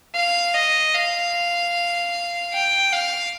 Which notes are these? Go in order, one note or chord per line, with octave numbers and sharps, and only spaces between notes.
F5
D#5
F5
G5
F5